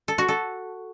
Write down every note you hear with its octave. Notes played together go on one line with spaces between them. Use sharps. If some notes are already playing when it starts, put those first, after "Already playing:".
A4
F#4
A4